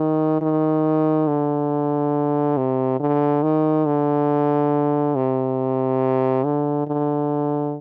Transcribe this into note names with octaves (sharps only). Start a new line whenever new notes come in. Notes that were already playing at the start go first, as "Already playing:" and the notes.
Already playing: D#3
D#3
D3
C3
D3
D#3
D3
C3
D3
D3